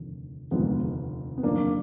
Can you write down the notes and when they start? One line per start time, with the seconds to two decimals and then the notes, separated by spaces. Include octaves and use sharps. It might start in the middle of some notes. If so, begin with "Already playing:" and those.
Already playing: F1 D#2 D3 F3
0.51 F1 D#2 D3 F3 G#3 B3
1.38 B3
1.43 F#1 F2 D#3 A#3 D4